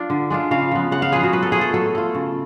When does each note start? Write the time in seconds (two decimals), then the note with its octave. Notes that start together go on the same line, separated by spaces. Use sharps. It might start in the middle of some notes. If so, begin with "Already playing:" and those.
Already playing: D4 F4
0.10 D3
0.30 G#3 D4 F4
0.51 C#3 F5
0.72 F3 B3
0.92 C#3 F#5
1.02 F5
1.12 F3 B3 G#4
1.23 F#4
1.33 F#3 B4
1.42 A4
1.52 A3 F4 G#4
1.61 A4
1.74 F#3 A4
1.95 A3 F4
2.15 C#3